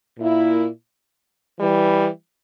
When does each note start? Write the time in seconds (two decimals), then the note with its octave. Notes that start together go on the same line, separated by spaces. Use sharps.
0.18 A#2 A#3 E4
1.58 E3 G3